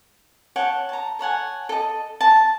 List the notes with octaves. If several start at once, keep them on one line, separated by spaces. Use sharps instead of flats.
C#5 F#5 G5 A5
A5 A#5
A4 C#5 F#5 G#5
A4 D#5
A5